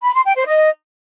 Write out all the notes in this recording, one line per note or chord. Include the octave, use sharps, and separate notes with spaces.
B5
C6
G5
C5
D#5